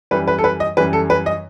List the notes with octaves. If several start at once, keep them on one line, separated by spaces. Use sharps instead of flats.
F#2 E3 G3 B4
B4
A4
B4
D#5
F#2 E3 G3 B4
A4
B4
D#5